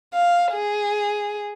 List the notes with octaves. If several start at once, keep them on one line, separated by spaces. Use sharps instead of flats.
F5
G#4